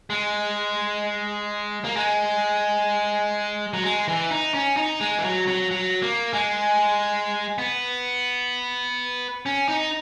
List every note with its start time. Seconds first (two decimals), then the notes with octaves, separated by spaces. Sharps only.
0.10 G#3
1.85 A#3
1.96 G#3
3.73 F#3
3.84 G#3
4.08 E3
4.31 D#4
4.54 C#4
4.77 D#4
5.01 G#3
5.18 E3
5.24 F#3
5.48 F#3
5.71 F#3
6.02 A#3
6.33 G#3
7.58 B3
9.46 C#4
9.69 D#4